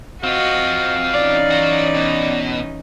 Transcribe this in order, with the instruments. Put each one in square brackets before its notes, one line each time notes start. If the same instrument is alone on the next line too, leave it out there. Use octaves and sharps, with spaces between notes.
[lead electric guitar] C4 F4 [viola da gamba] F#4 D#5 [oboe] F5
[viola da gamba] E3 C#4 D#4 [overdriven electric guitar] D5
[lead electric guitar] F#4 C#5
B2